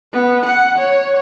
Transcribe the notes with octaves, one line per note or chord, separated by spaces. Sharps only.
B3
F#5
C#5